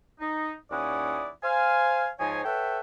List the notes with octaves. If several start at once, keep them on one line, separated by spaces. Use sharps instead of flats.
D#4
D#2 C#4 E4 D5 F#5 D#6
C5 F5 G#5
G#2 F3 D#4 C#5 G#5
A4 B4 C#5 E5 F#5 G5